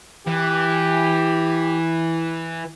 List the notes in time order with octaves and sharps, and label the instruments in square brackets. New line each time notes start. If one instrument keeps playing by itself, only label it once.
[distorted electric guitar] E3 [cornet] G4